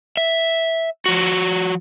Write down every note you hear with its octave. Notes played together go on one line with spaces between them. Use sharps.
E5
F3 F#4